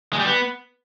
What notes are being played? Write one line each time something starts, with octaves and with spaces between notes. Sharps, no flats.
G#3
G3
B3